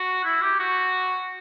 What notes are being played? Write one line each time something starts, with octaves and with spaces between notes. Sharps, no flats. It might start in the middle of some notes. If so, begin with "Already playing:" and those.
Already playing: F#4
E4
G4
F#4